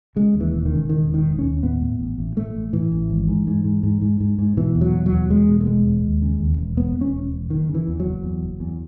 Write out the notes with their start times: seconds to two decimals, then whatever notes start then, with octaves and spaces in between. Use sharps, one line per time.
0.16 C#3 G#3
0.34 D#2
0.40 E3
0.53 E1
0.65 D#3
0.72 C#3
0.89 E1 D#3
1.08 E1
1.14 D#3
1.26 E1
1.38 C#4
1.45 D#2
1.63 A2 B3
1.82 A2
1.99 A1
2.18 A1
2.36 A2 A3
2.55 A1
2.73 A2 E3
2.92 A1
3.10 G#1
3.28 G#2
3.47 G#2
3.65 G#2
3.83 G#2
4.02 G#2
4.20 G#2
4.39 G#2
4.57 B2 E3
4.75 E2
4.81 F#3
4.93 B2
5.06 F#3
5.12 E2
5.30 E2 G#3
5.48 B2
5.61 A3
5.66 E1 G#3
5.85 E1
6.04 D#2
6.22 C#3
6.40 D#2
6.58 E1
6.77 E1 B3
6.96 E1
7.01 C#4
7.14 E1
7.31 E1
7.50 F#1 D#3
7.68 C#3
7.75 E3
7.88 E2
8.00 F#3
8.06 F#1
8.23 E2
8.42 F#1
8.60 E2